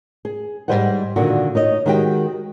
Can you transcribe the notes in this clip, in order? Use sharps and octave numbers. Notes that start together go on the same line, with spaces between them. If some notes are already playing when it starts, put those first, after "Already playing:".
G#4
G#2 E3 G3 C5 D#5 F#5
A#2 D3 D#3 F#4
D#4 C#5 D#5
D#3 G#3 F#4 G4 E5 G5